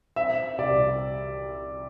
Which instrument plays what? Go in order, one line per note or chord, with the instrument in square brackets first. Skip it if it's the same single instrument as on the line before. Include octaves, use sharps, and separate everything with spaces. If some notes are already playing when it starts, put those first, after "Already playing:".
[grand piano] C4 E5
C2 D5